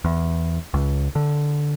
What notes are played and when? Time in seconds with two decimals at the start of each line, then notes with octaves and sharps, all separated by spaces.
0.04 E2
0.74 C#2
1.15 D3